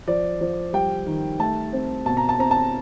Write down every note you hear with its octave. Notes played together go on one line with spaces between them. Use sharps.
F3 D5
F3
G3 G5
D#3
A3 A5
C4
B2 A5
A#5
A5
C4 A#5
A5